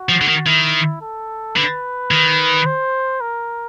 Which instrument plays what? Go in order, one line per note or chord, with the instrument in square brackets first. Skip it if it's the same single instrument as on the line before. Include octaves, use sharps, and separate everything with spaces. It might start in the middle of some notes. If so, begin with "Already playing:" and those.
Already playing: [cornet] F#4
[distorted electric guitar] F3
D3
D#3
[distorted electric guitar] D#3 [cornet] E4
[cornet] A4
[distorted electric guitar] D3 [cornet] B4
[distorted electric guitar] D#3
[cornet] C5
A#4